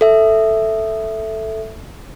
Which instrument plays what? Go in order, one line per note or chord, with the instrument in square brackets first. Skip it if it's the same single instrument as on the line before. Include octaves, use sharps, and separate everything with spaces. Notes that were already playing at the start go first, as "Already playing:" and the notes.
[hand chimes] A4 E5